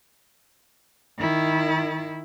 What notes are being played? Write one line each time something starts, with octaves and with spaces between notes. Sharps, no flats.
D#3 E4